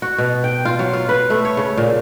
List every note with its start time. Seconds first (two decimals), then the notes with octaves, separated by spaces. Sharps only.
0.02 F#4
0.18 B2
0.44 G5
0.65 F4
0.79 F#3
0.94 F4
1.09 B4
1.30 A3
1.45 C#5
1.57 C#3
1.77 A#2